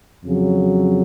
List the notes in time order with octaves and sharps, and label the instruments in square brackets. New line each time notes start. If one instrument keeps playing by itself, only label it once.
[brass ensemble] F2 C#3 F#3